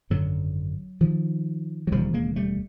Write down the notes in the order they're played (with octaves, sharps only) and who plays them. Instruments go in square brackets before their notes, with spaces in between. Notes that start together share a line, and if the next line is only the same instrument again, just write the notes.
[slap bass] G#1 F#2 D3 F#3
D#3 F3
F#3
E1 D#2 C#3 F3 G3
G#3 A#3
G3 A3